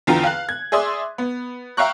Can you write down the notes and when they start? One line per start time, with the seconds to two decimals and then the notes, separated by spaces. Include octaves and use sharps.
0.07 E2 D3 F4 G5 A#5
0.24 F5 F#6
0.49 G#6
0.72 G#4 D5 E5 C6 D#6
1.18 B3
1.77 E5 F5 G5 A#5 C#6 F#6